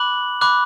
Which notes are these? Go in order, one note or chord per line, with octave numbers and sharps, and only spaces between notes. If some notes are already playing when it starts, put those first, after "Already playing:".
Already playing: B5 D6 F#6 F#7
B5 D6 F#6